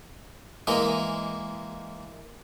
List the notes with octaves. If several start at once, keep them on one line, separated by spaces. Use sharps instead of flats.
E3 G#3 A#3 D#5